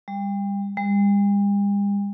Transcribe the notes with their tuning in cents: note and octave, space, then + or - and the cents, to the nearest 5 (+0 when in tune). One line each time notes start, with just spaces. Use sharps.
G3 +30
G3 +45